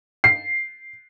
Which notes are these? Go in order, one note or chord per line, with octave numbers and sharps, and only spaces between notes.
C7